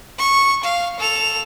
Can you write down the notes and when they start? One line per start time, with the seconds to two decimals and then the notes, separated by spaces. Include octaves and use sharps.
0.19 C#6
0.64 F5
1.00 A4 F7